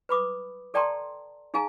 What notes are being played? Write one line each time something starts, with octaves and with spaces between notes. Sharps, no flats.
B4 B5 D6 D#6
A4 D5 G5 A5 A#5 C6
D#4 G#4 F5 G#5 A#5